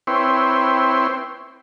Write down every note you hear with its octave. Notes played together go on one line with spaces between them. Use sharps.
C4 E4 B4 C#5 G5 C6